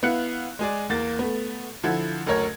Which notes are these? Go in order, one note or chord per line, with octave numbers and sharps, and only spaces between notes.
B3 E4 F5 F#6 C#7
G#3 G#4 D5
E2 A#3 A6
A3 B3
D3 F3 E4 F#5 G#6
F#1 D2 A#4 C#5 G#6